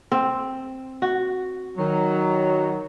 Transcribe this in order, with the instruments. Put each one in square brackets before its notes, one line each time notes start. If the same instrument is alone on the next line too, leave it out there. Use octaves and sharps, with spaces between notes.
[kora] C4
F#4
[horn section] D#3 F#3